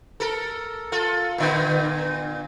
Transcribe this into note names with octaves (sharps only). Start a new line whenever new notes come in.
A4 A#4
F4 A4
A#2 D3 B3